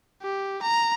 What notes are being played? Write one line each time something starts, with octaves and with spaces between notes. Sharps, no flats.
G4
A#5